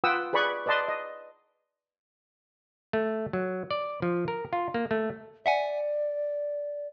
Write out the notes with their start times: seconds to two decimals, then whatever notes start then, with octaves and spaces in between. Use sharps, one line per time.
0.04 F4 B4 F#5 G5 D#6 E6
0.33 G#4 B4 D5 B5 C#6
0.66 B4 D5 D#5 A5 C6 D#6
0.88 D#5
2.93 A3
3.33 F#3
3.71 D5
4.02 F3
4.28 A#4
4.53 F4
4.74 A#3
4.91 A3
5.46 D5 E5 F#5 G#5